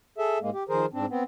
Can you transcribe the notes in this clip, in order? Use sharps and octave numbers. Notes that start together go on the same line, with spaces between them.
G#4 A4 E5
G#2 G#3 A#3
G4
D#3 F3 G#4 A#4 C5
G#2 C4 D4
B3 C4